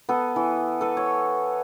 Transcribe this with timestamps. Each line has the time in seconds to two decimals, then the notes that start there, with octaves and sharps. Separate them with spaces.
0.09 B3 A4
0.36 E3
0.81 A4 B4
0.97 C#5